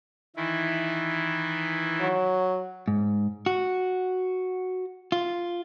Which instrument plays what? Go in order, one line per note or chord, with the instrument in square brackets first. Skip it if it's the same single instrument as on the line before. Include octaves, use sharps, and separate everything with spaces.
[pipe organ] D#3 E3 E4
[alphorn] F#3
[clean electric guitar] G#2
F#4
F4